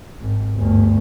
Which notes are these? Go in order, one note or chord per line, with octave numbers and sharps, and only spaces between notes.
G#1
G1 D2